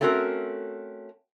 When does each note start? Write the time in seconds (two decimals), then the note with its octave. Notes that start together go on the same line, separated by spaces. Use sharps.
0.01 A3 C4 C#4 F#4 A#4